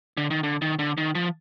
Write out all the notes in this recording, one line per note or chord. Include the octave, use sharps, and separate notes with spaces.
D3
D#3
D3
D#3
D3
D#3
F3